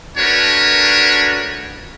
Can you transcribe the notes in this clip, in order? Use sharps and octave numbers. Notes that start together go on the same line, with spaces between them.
A3 D4 F#4 A#4 B4 C#5